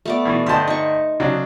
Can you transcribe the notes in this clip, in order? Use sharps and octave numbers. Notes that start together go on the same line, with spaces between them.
A3 B3 D5
B2 E3
G2 D3 C5 D#5 A5
D#4 C#6
C#3 F#3 D4